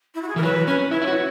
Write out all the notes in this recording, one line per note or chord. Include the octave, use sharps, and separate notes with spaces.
E4
F#4
G#4
E3 A#4
F#3 B4
C#4 B4
E4 C#5
E4
F#4